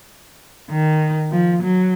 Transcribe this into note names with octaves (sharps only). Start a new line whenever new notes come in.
D#3
F3
F#3